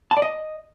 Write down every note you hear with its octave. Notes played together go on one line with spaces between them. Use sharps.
A5
D5
D#5